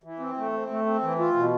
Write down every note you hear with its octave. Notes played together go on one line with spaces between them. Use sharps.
E3
C4
A3
C4
A3
C4
E3
F4
B2